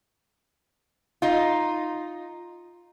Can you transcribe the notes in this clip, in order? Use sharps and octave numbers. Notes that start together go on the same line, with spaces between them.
D#4 F4